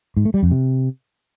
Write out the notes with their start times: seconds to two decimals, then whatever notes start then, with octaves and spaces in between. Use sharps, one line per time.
0.17 G#2
0.25 A3
0.34 G3
0.43 F2
0.51 C3